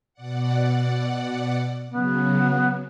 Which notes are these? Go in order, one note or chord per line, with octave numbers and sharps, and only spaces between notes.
B2 D5 F#5
C#3 F#3 B3